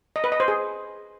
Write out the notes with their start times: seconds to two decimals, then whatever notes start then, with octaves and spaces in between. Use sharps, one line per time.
0.16 D#5
0.24 B4
0.32 D#5
0.40 C5
0.48 G#4